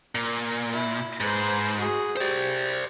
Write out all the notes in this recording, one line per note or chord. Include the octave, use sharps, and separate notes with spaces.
A#2
E4
G#2 B4 C5
F#4 G#4
G4 C5 D5